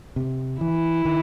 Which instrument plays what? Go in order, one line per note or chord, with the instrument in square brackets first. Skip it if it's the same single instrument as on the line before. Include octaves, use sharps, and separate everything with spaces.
[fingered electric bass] C3
[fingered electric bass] E3 [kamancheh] E4
[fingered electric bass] D#3